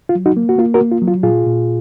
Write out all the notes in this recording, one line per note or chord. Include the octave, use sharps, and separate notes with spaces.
F4
F#3
D#4 F#4
A#3
F#4
A#3 F4
F#4 A#4
A#3
F4
F#3
F4
A#2 F4 G#4
A#2